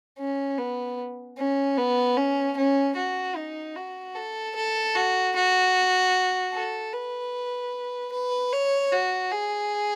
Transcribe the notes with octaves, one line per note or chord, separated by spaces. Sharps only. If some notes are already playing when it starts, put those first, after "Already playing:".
C#4
B3
C#4
B3
C#4
C#4
F#4
D#4
F#4
A4
A4
F#4
F#4
A4
B4
B4
C#5
F#4
G#4